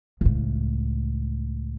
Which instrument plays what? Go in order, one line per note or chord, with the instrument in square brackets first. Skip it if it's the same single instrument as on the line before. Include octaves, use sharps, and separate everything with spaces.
[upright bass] C#2 A2